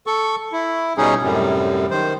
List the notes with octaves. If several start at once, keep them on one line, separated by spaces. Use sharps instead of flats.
A4 C#6
E4
B2 G3 C#4 D#4 G#4
F#2 A2 C3 G3
D#3 C5